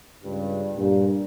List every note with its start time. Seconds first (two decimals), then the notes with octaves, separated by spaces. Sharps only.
0.24 C#2 G2
0.76 G2 A#2